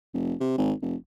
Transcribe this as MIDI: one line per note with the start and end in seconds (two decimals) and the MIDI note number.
0.14 0.34 29
0.41 0.54 48
0.58 0.73 32
0.82 0.95 29